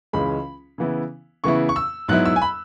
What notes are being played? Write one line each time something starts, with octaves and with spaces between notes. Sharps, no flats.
C#2 C#3 E3 G#3 C#4 B5
C#3 E3 B3 E4
C#3 E3 B3 E4 C#6
C#6
E6
G#2 F#3 B3 E4 F#6
E6
G#5
B5